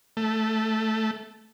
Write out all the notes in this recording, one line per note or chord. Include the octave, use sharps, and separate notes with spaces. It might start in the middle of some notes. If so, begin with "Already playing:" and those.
A3